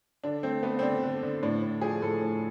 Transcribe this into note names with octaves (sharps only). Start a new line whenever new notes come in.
D3 D4
A3 C4
A3 B3
C4
D3 D4
D3
D3
A2 D4
A2
F3 G#4
A2 A4
A2